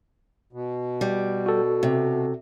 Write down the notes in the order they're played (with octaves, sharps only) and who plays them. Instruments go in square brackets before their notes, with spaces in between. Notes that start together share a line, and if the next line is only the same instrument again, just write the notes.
[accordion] B2
[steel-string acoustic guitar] G3
[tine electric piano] F#4 A4
[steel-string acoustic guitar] C3